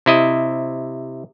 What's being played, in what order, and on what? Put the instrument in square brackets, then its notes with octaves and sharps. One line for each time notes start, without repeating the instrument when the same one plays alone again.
[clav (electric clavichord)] C3 E4 D#5